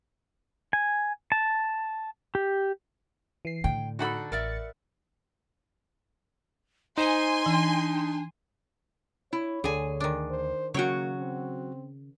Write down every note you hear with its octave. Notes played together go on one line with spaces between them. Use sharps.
G#5
A5
G4
E3 C7
A2 D3 G5
D4 D#4 F#4 A4 F#5 B5
A1 A#4 D5 E5 A6 C#7
D#4 C5 G#5 C6
E3 D4
E4 C#5
D2 D3 G#4 G#5
D#3 D4
C5
C#3 F#3 A#3 F#4 C#5 G5
C4